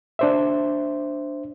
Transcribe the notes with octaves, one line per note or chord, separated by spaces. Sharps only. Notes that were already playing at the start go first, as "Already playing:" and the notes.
D4 C5 E5